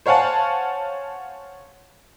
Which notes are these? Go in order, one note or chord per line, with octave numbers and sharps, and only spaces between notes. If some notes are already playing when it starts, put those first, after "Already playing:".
C5 C#5 F5 F#5 G#5 A5